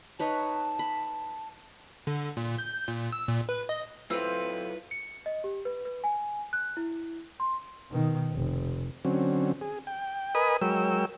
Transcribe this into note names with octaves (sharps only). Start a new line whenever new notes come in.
D#4 B4 C#5 A5
B5
D3
A#2
G6
A#2
E6
A#2
B4
D#5
F#3 C4 E4 F4 A4 B4 F5
C#7
D#5
G4
B4
B4
G#5
F#6
E4
C6
B2 D#3
F1
D3 F#3 C4 C#4
G#4
G5
A#4 B4 D#5 G#5 B5 D#6
F#3 G#3 A#4 C#5 G5 E6